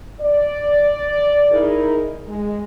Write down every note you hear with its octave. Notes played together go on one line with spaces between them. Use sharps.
D5
D#4 E4 G#4 A#4
G#3